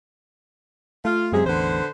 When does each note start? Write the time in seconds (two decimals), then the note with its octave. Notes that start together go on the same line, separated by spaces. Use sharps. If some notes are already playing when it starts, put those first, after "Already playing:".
1.05 A3 F4
1.32 F#2 C3 F#3 G#3 G#4
1.46 A1 E2 D3 B4 C5